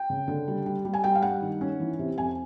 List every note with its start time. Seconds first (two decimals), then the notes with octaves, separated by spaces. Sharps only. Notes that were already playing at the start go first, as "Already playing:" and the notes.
Already playing: G5
0.10 C#3
0.28 D3
0.48 G3
0.66 G3
0.85 G3
0.94 G#5
1.04 G3 G5
1.15 F5
1.22 G2 F#5
1.42 D#3
1.61 C#4
1.80 E3
1.99 C3
2.18 F2 G#5